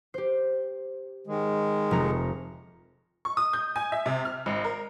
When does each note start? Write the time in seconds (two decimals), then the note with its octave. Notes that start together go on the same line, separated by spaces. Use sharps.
0.14 G4 C5
1.27 D#3 G#3
1.91 F1 A#5 C#7
3.25 C#6
3.37 D#6
3.53 G6
3.76 G#5
3.92 E5
4.06 C3
4.25 F6
4.46 G#1
4.64 A#4